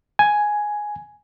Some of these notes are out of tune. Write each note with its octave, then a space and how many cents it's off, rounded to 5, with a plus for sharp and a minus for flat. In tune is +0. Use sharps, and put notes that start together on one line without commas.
G#5 +5